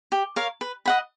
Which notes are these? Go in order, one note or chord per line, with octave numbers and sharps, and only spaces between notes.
G4
A#4 C#5 F5
B4
D#5 F#5 B5